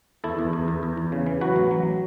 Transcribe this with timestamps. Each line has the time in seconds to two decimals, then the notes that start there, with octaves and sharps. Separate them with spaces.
0.24 E2 E4 A4
0.39 E2
0.53 E2
0.68 E2
0.83 E2
0.97 E2
1.12 C#3
1.26 E3
1.41 F#3 F#4 B4
1.56 A1
1.71 F#3